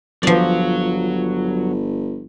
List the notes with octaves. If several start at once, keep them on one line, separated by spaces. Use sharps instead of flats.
G1 F3 F#3 D5